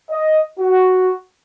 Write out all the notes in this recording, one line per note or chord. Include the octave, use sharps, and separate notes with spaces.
D#5
F#4